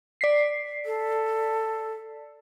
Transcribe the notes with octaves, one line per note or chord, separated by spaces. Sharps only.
D5 B6 C7
A4